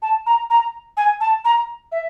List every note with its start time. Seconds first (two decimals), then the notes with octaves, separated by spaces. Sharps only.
0.02 A5
0.26 A#5
0.50 A#5
0.97 G#5
1.21 A5
1.45 A#5
1.92 E5